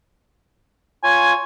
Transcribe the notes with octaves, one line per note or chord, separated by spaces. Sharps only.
F4 C#5 G#5